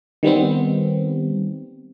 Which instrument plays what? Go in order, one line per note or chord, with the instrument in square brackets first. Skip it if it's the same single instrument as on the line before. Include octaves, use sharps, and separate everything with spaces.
[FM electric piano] D#3 G3 B3 C4